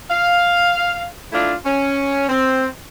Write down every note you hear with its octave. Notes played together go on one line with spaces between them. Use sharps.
F5
A3 D4 E4 F4
C#4
C4